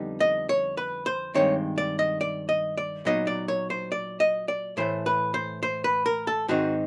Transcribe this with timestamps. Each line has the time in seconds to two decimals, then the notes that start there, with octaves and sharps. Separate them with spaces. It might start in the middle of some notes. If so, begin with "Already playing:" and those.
Already playing: F2 D3 G3 B3 D#4
0.20 D#5
0.49 C#5
0.77 B4
1.06 C5
1.34 G2 D#3 G#3 C4 C#5
1.78 D5
1.99 D#5
2.21 D5
2.49 D#5
2.77 D5
3.05 A#2 F#3 B3 D#4 D#5
3.27 D5
3.48 C#5
3.70 C5
3.92 D5
4.20 D#5
4.48 D5
4.77 A2 E3 A3 C5
5.06 B4
5.34 C5
5.63 C5
5.84 B4
6.06 A#4
6.27 A4
6.48 G#2 D#3 G#3 C4 D#4 F#4